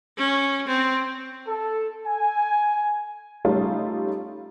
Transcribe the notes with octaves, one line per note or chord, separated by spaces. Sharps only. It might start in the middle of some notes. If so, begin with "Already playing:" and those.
C#4
C4
A4
G#5
G3 A3 C#4 D#4 F4